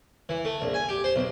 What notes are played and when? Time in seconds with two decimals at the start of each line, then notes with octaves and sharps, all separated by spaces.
0.29 E3
0.45 A3
0.62 A#1
0.74 G#5
0.89 G4
1.04 C5
1.16 B1